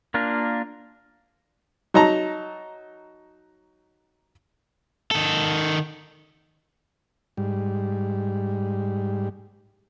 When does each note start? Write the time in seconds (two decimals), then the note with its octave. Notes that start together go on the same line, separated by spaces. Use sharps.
0.14 A#3 D4 F4 A#4
1.94 F#3 D#4 A5 A#5
5.11 D#3 A4
7.37 G#2 G3